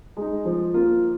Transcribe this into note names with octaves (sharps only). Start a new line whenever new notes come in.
G#3 D#4
F3
A#3 F4